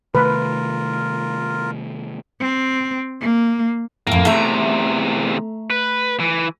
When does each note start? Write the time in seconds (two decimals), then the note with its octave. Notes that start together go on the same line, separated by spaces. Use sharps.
0.15 C3 D#3 A3 F4 A#4 B4
2.40 C4
3.21 A#3
4.07 F2 A2 A#3
4.26 E2 C3 A3 E5 A#5
5.70 B4
6.20 E3